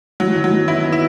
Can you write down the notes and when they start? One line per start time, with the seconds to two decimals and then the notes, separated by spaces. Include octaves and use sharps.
0.20 E3 F#3
0.36 D#3
0.44 F#3
0.52 B3
0.68 B3 E4
0.84 B3
0.92 E4